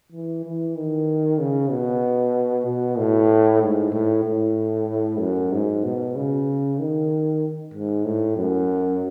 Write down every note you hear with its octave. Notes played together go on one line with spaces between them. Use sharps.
E3
E3
D#3
C#3
B2
B2
A2
G#2
A2
A2
F#2
G#2
B2
C#3
D#3
G#2
A2
F#2